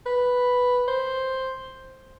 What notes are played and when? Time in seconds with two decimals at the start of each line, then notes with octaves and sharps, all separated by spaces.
0.06 B4
0.88 C5